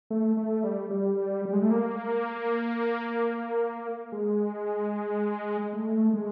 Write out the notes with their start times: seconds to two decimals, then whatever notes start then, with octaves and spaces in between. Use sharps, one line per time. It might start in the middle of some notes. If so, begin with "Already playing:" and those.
0.10 A3
0.37 A3
0.64 G3
0.91 G3
1.45 G3
1.53 G#3
1.62 A3
1.71 A#3
4.12 G#3
5.73 A3
6.14 G#3